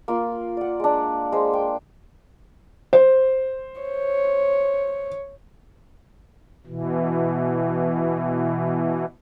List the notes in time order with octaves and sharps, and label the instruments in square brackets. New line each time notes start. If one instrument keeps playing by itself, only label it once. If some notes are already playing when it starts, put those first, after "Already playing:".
[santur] A#3 F4 F5
D5 F#5
G#3 D4
G#3 C5
G5
[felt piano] C5
[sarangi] C#5
[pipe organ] B2 E3